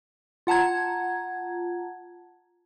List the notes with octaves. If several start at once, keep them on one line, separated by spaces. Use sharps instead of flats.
F4 F#5 A5 A#5 G#6